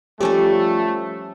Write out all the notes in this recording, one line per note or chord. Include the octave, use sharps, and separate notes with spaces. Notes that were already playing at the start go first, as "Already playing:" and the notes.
F3 G3 A3 C#4 G4 A4